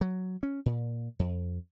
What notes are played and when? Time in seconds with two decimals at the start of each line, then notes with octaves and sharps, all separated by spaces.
0.01 F#3
0.43 C#4
0.66 A#2
1.19 F2